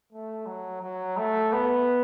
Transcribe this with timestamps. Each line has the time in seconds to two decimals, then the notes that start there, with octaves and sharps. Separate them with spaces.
0.12 A3
0.46 F#3
0.81 F#3
1.17 A3
1.52 B3